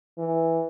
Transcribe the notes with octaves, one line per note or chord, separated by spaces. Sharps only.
E3